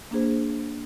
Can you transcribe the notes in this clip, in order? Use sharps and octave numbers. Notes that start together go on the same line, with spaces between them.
A#3 D4 G#4 C5